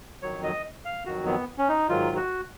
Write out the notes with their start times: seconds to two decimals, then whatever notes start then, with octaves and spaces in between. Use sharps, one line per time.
0.22 F2 D#3 F#3 C#5
0.43 D#5
0.85 F5
1.06 F2 D#3 F#3 F#4
1.26 B3
1.58 C#4
1.69 D#4
1.89 G#2 D#3 F#3 F4
2.16 F#4